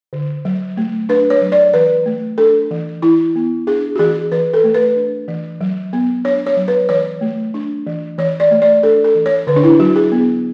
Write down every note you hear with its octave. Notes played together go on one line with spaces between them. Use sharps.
D3
F#3
A3
D4 B4
C#5
F#3
D5
E3 B4
A3
D4 A4
E3
E3 E4
B3
D4 G#4
F#4
E3 G#4
E3 B4
A4
A3
B4
D4
E3
F#3
B3
D4 C#5
C#5
F#3
B4
E3 C#5
A3
D4
E3
E3 C#5
D5
A3
D5
D4 A4
A4
E3
C#5
D3 B4
D4
E4
F#3 F#4
G#4
B3